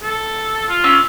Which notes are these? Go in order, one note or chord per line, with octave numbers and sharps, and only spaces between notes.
A4
F4
C#4 E6